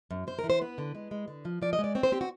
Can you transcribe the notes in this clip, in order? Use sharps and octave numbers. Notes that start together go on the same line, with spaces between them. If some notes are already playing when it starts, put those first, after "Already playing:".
F#2
F#2 C5
A#4
E3
C5
B3 B4
D3
G#3
G#3
D3
F3
F3 D5
D#5
G#3
D5
C4 C#5
C5
C4 G4
F#4